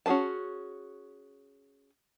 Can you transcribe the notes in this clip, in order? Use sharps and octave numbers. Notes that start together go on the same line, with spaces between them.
C#4 F#4 G#4 B4 A5